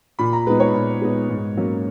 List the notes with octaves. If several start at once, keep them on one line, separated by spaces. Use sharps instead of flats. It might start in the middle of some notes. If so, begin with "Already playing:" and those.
A#2 B5
A#5
G#3 B3 D#4 B4
C#5
A#2
G#3 B3 D#4
G#2
F#3 A#3 C#4